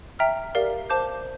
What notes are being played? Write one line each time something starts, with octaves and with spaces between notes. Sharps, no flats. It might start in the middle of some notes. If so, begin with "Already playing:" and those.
E5 G5 A#5 F6
G4 A#4 D5 F5
C5 F5 A5 D6 G6